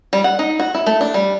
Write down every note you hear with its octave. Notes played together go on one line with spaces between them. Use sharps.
G3
F#5
D#4
F#4
E4
A3
D4
G3